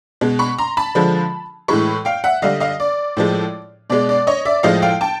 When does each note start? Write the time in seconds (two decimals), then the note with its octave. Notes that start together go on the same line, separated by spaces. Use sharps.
0.21 B2 G#3
0.39 B5 C#6
0.58 A#5 C6
0.77 A5 B5
0.95 D3 F3 G#3
1.68 A2 E3 G#3 B5 C#6
2.05 F5 G5
2.24 E5 F#5
2.42 D3 G3 D#5 F5
2.60 D#5 F5
2.80 D5
3.17 A2 F3 G#3
3.90 B2 G#3 D5
4.09 D5
4.27 C#5 D#5
4.45 D5 E5
4.63 A2 F3 G#3 D#5 F5
4.82 F5 G5
5.01 G5 A5